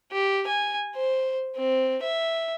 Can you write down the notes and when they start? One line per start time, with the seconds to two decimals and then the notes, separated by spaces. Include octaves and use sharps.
0.12 G4
0.47 G#5
0.95 C5
1.56 C4
2.03 E5